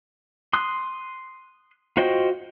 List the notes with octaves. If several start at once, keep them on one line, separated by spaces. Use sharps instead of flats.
C6 D#6 F#6
F4 F#4 C5 D#5 G5